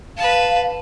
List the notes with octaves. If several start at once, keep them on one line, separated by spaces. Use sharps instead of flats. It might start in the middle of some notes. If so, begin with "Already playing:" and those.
B4 F5 A5